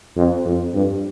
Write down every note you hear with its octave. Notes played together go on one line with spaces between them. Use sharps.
F2
F2
G2